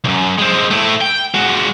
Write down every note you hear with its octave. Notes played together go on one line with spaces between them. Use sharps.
C2 F#2
G#3 C4
A3 E4
G5
G#3 F#4